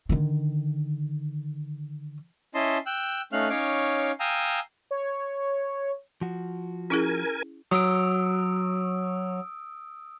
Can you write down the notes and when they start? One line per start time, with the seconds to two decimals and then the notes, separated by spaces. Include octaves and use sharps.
0.09 D3 D#3
2.55 C#4 E4 D#5 A5 C6
2.86 G5 E6 F#6
3.33 A3 C#4 D#4 F5 F6 F#6
3.50 C#4 D#4 C#5 F5 D6
4.20 F5 G5 G#5 A#5 D#6 E6
4.91 C#5
6.21 F3 F#4
6.90 C#4 E4 G#4 A#4 G#5
7.71 F#3 D#6 E6 D7